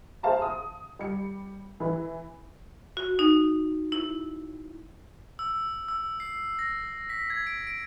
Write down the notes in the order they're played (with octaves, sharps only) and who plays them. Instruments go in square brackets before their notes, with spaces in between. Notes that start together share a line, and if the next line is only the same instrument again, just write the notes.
[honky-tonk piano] G#4 C5 E5 F5 A5 A#5
D#6
G3 C#7
E3 B4
[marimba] F#4
D#4
E4
[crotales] E6
E6
C7
A#6
B6
G#6
D7
D7